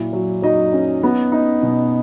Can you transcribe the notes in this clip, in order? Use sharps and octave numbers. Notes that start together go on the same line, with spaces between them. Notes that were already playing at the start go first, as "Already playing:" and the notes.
Already playing: A#2 F#3 E4
F#3
F#3 D#4 D#5
C#4
B3
D#4
B2